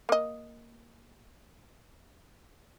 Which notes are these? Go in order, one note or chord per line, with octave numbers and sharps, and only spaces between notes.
A#3 D#5